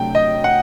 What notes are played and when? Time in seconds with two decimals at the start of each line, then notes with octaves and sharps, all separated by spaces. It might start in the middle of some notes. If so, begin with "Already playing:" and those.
Already playing: C3 F#3 A3 D4 G5
0.15 D#5
0.44 F#5